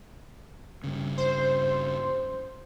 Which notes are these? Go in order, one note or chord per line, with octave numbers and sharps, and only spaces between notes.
G2 C#3
C5